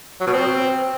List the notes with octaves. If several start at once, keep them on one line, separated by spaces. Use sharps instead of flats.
F#3
B2
C4